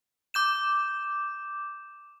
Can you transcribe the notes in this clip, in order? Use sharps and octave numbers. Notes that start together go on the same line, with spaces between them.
D6 G6 E7